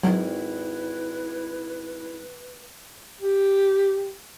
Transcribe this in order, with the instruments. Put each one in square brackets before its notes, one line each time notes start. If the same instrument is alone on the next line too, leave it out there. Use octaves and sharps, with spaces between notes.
[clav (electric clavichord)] G#1 [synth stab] F#3 [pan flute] E4 [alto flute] B4
[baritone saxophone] G4